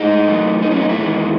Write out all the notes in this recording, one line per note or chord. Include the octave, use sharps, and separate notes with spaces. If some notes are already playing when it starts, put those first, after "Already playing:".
Already playing: A2 G#3 D#4
F#2 E3 A3
D#4
C#4
D#4
E4
E2 D#3 G#3